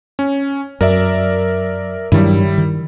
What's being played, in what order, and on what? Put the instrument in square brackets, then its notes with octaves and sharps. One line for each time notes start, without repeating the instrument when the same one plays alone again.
[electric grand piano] C#4
[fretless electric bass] F#2 [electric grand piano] A#4 D5 E5
[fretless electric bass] G2 D#3 F#3 [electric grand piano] G3 E4
[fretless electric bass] D#3